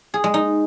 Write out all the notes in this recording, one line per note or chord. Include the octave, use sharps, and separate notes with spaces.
G#4
G#3
D#4